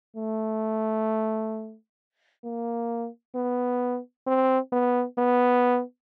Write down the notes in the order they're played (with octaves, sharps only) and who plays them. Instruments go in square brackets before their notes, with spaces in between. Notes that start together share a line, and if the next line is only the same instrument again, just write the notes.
[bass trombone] A3
A#3
B3
C4
B3
B3